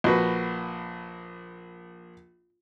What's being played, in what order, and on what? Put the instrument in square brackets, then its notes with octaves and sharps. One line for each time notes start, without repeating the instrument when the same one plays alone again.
[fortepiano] A#1 F#4 B4